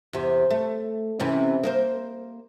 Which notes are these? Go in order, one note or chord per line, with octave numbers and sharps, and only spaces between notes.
E2 C3
A3
C3 E3 C#4
A#3 D#4 C5